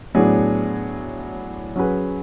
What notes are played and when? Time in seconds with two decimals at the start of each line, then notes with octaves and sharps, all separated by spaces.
0.15 A2 F#3 B3 D4 G#4
1.76 F#3 C#4 G#4 B4